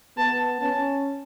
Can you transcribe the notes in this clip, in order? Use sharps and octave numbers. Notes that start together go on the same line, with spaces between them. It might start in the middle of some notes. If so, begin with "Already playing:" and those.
B3 A5
C#4 A5